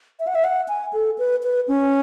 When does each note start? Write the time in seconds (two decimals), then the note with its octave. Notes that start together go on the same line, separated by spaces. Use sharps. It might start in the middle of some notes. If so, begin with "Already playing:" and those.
0.19 E5
0.27 F#5
0.35 E5
0.44 F#5
0.68 G#5
0.93 A4
1.19 B4
1.43 B4
1.68 C#4